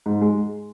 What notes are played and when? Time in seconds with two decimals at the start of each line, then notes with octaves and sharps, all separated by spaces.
0.06 G#2
0.21 G#3